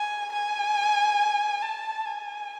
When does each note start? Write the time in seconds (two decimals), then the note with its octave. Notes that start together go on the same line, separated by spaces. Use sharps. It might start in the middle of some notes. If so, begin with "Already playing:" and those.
Already playing: G#5
0.33 G#5
1.62 A5
2.05 G#5